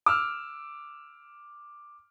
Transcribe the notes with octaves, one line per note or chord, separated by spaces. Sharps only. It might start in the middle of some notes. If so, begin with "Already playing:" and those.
D6 E6 F6